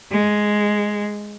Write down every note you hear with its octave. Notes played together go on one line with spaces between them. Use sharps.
G#3